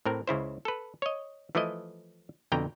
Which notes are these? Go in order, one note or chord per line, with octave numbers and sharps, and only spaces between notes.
A2 C4 A#4
C#2 C#3 E4 C5
A4 B4
C#5 D#5
E3 F3 A3 E4 D#5
F2 B2 D3 G5 A#5